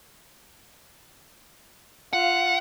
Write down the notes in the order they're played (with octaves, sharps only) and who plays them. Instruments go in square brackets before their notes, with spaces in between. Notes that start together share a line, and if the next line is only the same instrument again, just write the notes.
[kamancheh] F4 F5 [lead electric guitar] F#5